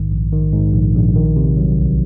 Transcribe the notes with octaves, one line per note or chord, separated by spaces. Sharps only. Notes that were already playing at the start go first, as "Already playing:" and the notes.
Already playing: A#1 G#2 D#3
A#1
D#3
G#2
A#1
A#1
D#3
C3
F#3
C2